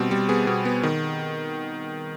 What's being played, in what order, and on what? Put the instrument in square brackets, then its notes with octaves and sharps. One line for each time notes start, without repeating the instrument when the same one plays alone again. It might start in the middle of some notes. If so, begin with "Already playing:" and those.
Already playing: [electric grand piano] B2 G3 C4
G3
B3 G#4
B2
B3
D#3